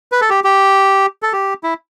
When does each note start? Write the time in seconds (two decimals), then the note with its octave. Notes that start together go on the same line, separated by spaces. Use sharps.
0.12 B4
0.21 A4
0.30 G4
0.44 G4
1.22 A4
1.33 G4
1.63 E4